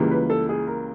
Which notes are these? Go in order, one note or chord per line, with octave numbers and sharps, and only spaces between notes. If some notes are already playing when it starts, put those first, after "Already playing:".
Already playing: C#2 C#3 E3 G3 A#3
B4
A4
G#4
A#4